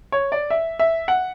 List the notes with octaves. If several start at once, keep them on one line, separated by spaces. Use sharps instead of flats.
C#5
D5
E5
E5
F#5